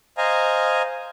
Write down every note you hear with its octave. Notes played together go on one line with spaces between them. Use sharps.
C5 D#5 F5 G#5 A#5